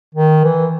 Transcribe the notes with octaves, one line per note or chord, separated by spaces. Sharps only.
D#3
E3